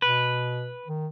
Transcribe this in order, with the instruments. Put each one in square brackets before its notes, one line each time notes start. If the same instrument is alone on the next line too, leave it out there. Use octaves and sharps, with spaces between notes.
[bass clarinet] B2 [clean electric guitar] B4
[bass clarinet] D#3